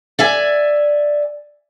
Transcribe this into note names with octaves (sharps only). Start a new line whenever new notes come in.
D5 E5 G#5